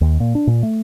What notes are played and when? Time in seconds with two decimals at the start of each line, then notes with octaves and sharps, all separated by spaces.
0.01 D#2
0.20 A#2
0.35 D4
0.47 A#2
0.63 A3